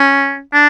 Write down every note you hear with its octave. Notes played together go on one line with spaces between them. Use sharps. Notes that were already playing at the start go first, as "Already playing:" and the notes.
Already playing: C#4
D4